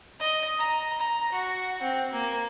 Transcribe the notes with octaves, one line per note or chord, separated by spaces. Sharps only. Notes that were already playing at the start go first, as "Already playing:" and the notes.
D#5
A#5
A#5
F#4
C4
A#3